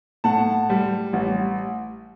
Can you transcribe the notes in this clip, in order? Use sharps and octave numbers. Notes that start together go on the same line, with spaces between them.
A2 F#5 A5
G3
A1